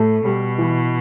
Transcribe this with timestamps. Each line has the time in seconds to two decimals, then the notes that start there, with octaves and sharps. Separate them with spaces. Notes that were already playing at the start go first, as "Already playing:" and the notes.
Already playing: A2 A3
0.24 B2 G3
0.58 E3